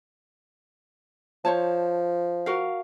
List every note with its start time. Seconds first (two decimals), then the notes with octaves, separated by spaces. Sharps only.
1.45 F3 C5 C#5 A5
2.46 F#4 A#4 F5